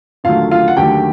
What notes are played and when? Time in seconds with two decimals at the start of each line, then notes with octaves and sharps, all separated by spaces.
0.24 D#2 D3 F#3 A3 F4 F5
0.51 F4 F5
0.68 F#5
0.77 D#2 D3 F#3 A3 G4 G5